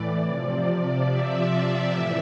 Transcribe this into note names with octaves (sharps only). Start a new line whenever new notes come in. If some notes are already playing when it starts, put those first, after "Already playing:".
Already playing: A2 E3 D5
C3 F3
E5
A2 E3